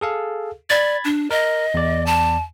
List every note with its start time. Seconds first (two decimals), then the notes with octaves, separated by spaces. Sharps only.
0.01 G#4 A4 F5
0.70 D5 B5 G#6 A6
1.05 D4
1.31 A#4 D#5
1.74 E2 D5
2.06 A5